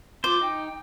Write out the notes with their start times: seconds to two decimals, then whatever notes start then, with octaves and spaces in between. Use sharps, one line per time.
0.24 F4 C5 D6
0.41 D#4 G5